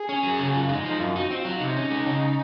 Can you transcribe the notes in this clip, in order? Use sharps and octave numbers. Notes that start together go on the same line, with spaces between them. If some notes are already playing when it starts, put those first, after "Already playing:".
Already playing: G#4
C#4
F#3
C#3
F#2 F4
G#3 D#4
F3 D#4
F#2 F4
D#4 F#4
C4
F4
F#3
C3 D#4
C#4
G#3
C#3